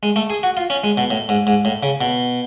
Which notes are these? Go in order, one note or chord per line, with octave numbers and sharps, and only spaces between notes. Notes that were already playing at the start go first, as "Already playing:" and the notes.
G#3
A3
G#4
F#4
F4
C#4
G#3
B2
A2
G#2
G#2
A2
C#3
B2